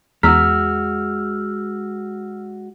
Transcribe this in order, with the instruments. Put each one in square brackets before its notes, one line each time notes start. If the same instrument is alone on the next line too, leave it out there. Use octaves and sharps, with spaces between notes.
[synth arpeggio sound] E2 A#5 B6 [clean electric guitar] G#3 F#4 [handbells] E6 F6